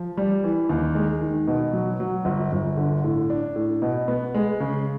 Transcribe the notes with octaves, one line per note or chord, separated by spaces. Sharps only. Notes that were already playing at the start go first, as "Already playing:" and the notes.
Already playing: F3
G3
E3
D#2
G#3
D#3
B2
F#3
F#3
G1
G1
D3
A2
D4
A2
B2
B3
G#3
C#3